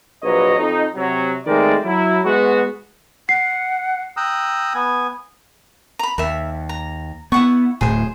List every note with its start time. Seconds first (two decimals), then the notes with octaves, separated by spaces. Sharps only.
0.23 A#1 F#3 B4 C#5 D#5
0.58 F2 D#4
0.96 C3 F#3
1.46 D#3 G#3 A3 C4 A#4 D5
1.85 F#3 E4
2.25 G#3 B3 F#4
3.29 F#5 C7
4.17 G5 A#5 D#6 E6 F#6
4.74 B3 G#5
5.99 A#5 B5
6.18 D#2 A#4 E5
6.69 A#5
7.32 B3 E4 F#5 C#6
7.81 D1 A2 G#4 C5